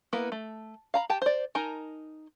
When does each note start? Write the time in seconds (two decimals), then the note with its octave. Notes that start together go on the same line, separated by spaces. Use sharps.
0.13 A#3 B3 E4 B4
0.32 A3
0.94 F5 A#5 B5
1.10 G4 G5 A5
1.22 C5 D5
1.55 D#4 A#4 G#5 A5